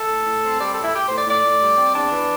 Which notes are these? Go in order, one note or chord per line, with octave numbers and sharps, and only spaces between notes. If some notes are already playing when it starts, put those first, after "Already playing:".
Already playing: A4
A2
A2
C4
G3 D5
A4
A2
E4
A2 G4
A2 C5
D5
A2 D5
A2
G3
C4
E2 D4
E3